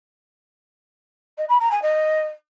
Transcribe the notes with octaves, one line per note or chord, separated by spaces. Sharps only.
D#5
B5
A#5
G#5
D#5